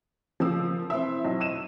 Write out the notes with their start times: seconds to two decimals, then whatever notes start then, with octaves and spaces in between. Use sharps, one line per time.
0.40 C#3 F3 A#3 E6
0.90 E3 C4 E5
1.25 B1
1.40 E6 D#7 E7